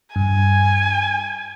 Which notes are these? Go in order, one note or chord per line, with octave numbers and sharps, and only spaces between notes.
G2 G#5